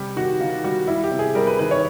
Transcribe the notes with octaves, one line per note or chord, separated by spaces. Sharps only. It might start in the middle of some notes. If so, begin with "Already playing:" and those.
Already playing: C3 G3 G4
D#3 F#4
D#3 F4
G3 F#4
G3 E4
G4
C3
G#4
G3 A#4
B4
D#3 B4
C#5